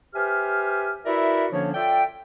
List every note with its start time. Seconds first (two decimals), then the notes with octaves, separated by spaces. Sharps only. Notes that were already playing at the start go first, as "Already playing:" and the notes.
0.15 G4 B4 C5 E5 G#5 F6
1.06 E4 F#4 A#4 B4 D5 E5
1.52 D3 F3 A#3 C#4 D4 C#5
1.75 F4 A4 D5 E5 G5